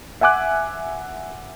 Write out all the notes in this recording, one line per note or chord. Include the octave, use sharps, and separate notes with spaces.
E5 F#5 G#5 D6 F#6